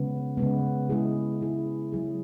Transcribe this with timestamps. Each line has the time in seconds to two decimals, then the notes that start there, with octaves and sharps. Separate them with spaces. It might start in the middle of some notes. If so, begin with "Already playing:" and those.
Already playing: C#3 G#3 B3
0.37 C#3 G#3 B3
0.90 G#3 E4 G#4
1.41 G#3 E4 G#4
1.92 C#3 F#3 E4 G#4